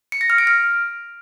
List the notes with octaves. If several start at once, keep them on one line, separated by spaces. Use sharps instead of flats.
C#7
A#6
F6
D7
F6